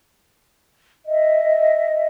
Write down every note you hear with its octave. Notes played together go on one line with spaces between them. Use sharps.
D#5 E5